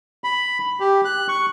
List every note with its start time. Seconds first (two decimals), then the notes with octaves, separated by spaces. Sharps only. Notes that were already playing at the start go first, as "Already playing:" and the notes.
0.24 B5
0.80 G4
1.05 F#6
1.29 C#6